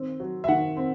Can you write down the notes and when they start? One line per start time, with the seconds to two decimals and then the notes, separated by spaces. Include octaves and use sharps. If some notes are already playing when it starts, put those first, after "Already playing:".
Already playing: D#3 C4
0.20 F#3
0.44 E5
0.48 D#3 F#5
0.77 C4